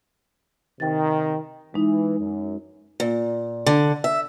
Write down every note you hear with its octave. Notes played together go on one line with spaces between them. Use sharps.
C3 D#3 G5 A6
E3 G#3 D#4
F#2
A#2
D3
E5